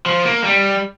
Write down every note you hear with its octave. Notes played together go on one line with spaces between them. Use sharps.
F3
A#3
G3